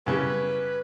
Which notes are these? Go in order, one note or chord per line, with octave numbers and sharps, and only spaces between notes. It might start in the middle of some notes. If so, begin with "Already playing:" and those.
F#2 C#3 G3 B4